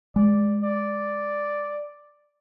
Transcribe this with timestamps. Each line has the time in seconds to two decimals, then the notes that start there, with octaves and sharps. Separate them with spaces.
0.16 G#3 D5
0.63 D5